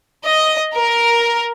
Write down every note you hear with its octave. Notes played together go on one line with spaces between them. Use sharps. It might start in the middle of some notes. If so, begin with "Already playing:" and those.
D#5
A#4